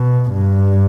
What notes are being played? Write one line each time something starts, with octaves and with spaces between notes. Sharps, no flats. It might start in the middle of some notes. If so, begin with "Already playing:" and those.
Already playing: B2
G2